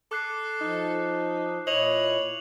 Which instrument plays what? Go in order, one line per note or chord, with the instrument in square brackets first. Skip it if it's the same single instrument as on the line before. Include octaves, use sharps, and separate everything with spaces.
[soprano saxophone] A4 [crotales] D6 F#6 C7
[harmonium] F3 [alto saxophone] D#4
[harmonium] A#2 E4 [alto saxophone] C#5 [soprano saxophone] D#5 [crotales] F7 F#7